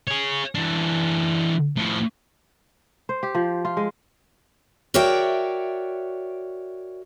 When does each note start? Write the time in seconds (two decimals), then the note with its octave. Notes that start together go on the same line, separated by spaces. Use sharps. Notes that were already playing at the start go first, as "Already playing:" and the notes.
0.08 G#4 C#5
0.55 E3 D4
1.77 A2 F3
3.09 C5
3.23 G4
3.35 F3
3.65 F4
3.77 G#3
4.94 F#4 A#4 C#5 D5 E5 G5